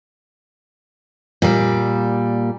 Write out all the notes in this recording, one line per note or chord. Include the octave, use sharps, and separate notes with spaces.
A#2 G3